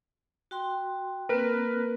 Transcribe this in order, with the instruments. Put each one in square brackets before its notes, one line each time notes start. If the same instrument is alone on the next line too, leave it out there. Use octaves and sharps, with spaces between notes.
[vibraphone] F#4 G5 C6
[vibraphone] A#3 C4 [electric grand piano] A#4 B4